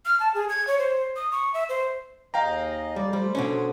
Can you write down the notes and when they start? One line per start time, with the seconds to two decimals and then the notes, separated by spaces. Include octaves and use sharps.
0.05 F6
0.20 A5
0.34 G#4
0.49 G#6
0.67 C#5
0.79 C5
1.16 D#6
1.32 C#6
1.54 E5
1.69 C5
2.34 D#2 G#4 D#5 F5 G5 A#5
2.96 F2 G3 D5
3.13 G3 A3 C5
3.35 B2 D3 C#4 C5 C#5